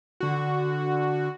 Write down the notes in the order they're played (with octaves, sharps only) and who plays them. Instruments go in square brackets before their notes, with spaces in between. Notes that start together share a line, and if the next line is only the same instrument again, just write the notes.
[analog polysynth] D3 F#4